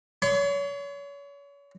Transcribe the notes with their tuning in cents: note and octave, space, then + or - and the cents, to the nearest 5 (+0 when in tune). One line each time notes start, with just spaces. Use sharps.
C#5 +35 C6 -30